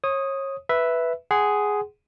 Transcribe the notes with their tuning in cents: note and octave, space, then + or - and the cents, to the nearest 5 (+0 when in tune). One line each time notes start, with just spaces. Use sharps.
C#5 -30 D#6 +0
B4 +0 E5 +0
G#4 +0 F#5 +25 C6 -15